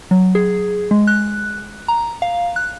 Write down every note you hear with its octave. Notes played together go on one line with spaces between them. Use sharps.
F#3
G#4
G#3
F#6
A#5
F5
F#6